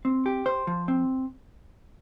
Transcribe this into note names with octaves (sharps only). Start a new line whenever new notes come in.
C4
G4
C5
F3
C4